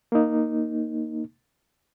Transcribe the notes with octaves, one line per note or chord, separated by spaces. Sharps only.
A#3 D#4